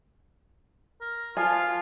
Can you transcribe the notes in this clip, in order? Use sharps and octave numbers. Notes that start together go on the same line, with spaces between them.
A#4
F3 F4 F5 G#5